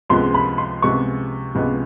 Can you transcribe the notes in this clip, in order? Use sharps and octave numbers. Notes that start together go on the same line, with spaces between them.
C#2 C3 F3 G#3 B3 C6
B5
C6
C#2 C3 F3 G#3 B3 C#6
C#2 C3 F3 G#3 B3